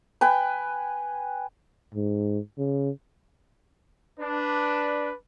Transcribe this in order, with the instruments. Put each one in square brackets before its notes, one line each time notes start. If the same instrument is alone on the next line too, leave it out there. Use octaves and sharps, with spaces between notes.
[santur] B4 G5 G#5
[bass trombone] G#2
C#3
[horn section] D4 [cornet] B4